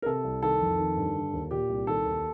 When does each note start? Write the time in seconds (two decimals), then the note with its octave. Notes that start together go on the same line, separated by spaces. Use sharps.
0.02 A#4
0.06 C3 A4
0.24 C2
0.42 D#3 A4
0.61 F2
0.78 D#3
0.97 G2
1.15 D3
1.33 D#2
1.51 A#2 G4
1.69 C2
1.87 D#3 A4
2.06 D#2